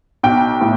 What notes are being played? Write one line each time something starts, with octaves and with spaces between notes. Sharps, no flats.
B1 G5
A2